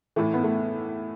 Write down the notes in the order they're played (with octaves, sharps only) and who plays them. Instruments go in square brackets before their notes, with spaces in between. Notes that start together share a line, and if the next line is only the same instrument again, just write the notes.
[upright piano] A2 E3 A3
B3
A3